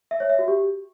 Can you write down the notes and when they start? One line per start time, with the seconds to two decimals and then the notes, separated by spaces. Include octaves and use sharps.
0.11 E5
0.20 C#5
0.29 E5
0.39 F#4
0.48 G4